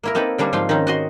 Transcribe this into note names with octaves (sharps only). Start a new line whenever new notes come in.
A#3 E4 A#4
A#3 C4 D#4 A4 B4
D3 G3 A#3 D4
G#2 F3 F5 G5 C6
D#3 C4 C#4 D#4
F#4 D#5 C6